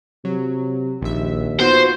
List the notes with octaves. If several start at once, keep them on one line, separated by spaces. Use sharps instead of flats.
C3 F#3
A#1 D#2 E5
B3 F4 F#4 C5